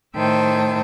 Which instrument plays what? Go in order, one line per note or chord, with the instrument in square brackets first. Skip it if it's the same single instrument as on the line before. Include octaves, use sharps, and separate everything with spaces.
[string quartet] A2 D#3 C5 E5 G5 A5